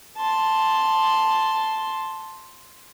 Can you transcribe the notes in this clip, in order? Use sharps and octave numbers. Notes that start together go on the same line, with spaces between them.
A5 C6